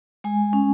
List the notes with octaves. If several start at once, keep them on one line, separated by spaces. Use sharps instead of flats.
G#3 G#5
C#4